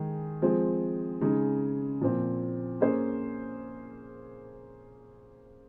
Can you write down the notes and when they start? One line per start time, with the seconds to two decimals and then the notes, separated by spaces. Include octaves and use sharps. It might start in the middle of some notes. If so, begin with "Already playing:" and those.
Already playing: D#3 G#3 D#4 G#4
0.42 F3 G#3 C4
1.21 C#3 G#3 D#4
2.01 A#2 F3 C4
2.81 A#3 C#4 G#4 C5